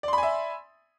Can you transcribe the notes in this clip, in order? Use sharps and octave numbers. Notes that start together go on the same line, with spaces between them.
D5 E5 G#5 B5 C6